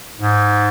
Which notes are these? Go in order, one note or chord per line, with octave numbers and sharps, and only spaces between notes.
G#2